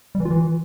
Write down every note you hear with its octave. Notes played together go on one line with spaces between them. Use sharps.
G3
E3
F4
E3